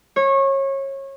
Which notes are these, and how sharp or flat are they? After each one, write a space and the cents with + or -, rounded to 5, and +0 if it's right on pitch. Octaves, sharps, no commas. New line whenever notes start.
C#5 -25